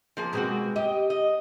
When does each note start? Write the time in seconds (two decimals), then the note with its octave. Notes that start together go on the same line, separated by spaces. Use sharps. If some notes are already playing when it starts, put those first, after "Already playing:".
0.17 F3 A#3 G#4
0.33 B2 G#3 A#3 C4 F#4
0.76 G4 D#5
1.10 D#5